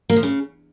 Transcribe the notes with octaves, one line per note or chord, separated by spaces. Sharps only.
A#3
F3
C#3